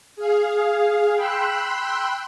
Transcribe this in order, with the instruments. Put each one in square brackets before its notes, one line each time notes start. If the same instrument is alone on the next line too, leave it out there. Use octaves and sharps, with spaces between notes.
[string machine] G#4 F5
G5 B5 C6 E6 F#6